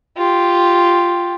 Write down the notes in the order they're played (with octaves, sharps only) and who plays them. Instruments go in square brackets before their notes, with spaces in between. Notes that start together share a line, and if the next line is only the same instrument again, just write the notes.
[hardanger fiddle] F4 G4